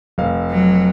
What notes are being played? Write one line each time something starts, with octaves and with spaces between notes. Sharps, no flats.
F1 F5
F#3